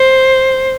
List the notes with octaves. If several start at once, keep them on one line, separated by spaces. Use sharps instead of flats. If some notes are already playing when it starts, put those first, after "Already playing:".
Already playing: C5